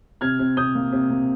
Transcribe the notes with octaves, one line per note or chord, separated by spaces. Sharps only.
C3 F6 G#6
C3
C3 D#6 G6
A#3
C3
A#3